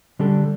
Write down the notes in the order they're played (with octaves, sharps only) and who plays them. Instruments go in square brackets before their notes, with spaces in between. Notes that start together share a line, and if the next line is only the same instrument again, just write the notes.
[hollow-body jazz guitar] D3 G3 D4 A4